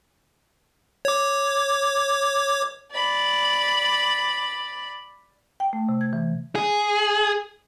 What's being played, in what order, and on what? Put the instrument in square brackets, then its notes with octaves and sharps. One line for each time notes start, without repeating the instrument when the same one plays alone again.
[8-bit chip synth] C#5 D6
[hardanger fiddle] D5 B5
[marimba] G5
A3
C3
G#6
E3
[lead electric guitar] G#4